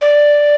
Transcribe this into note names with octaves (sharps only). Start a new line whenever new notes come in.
D5